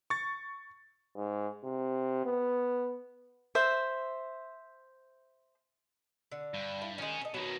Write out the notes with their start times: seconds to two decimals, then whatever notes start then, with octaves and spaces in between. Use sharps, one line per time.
0.10 C#6 A6
1.16 G#2
1.64 C3
2.26 B3
3.55 C5 E5
6.32 D3
6.54 G2
6.82 E4
6.98 D#3 G#3 C#4 G#4
7.21 A4 D#5
7.34 B2 D#3 F#3 B4